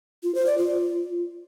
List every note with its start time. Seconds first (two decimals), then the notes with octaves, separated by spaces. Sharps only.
0.23 F4
0.35 C5
0.46 D5
0.58 F4